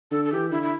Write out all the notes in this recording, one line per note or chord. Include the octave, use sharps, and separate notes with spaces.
D3 A4
A4
E3 G4
D3 E4
E4